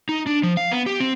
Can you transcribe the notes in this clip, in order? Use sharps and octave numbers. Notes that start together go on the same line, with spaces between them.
D#4
D4
F3
F5
B3
G4
C4